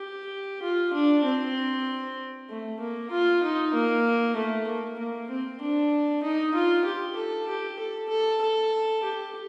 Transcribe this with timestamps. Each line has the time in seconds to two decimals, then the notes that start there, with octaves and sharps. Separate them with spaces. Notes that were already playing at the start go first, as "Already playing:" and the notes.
Already playing: G4
0.62 F4
0.93 D4
1.24 C4
2.50 A3
2.80 A#3
3.11 F4
3.43 D#4
3.74 A#3
4.36 A3
4.67 A#3
4.99 A#3
5.30 C4
5.61 D4
6.23 D#4
6.54 F4
6.85 G4
7.16 A4
7.48 G4
7.79 A4
8.09 A4
8.41 A4
9.03 G4